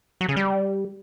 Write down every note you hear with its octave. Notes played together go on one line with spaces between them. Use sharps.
F#3
C#3
G3